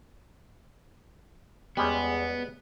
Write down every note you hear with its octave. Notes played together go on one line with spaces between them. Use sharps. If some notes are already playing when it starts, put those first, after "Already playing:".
E2 G3 G#3 B3 C#4